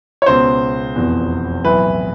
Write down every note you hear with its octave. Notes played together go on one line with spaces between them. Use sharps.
C#5
C#2 B2 C5
F1 E2 B2
B1 A2 E3 B4